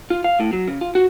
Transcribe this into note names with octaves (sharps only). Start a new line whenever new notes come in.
F4
F5
A2
F#3
C#3
F4
F#4